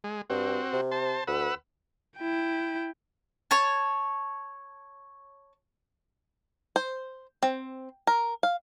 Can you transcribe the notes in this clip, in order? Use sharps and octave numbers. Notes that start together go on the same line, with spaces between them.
G#3
G2 C4 F#4
C3
C5 A5
D2 B4 F#5 E6
E4 G5
C#5 A5
C5
C4
A#4
F5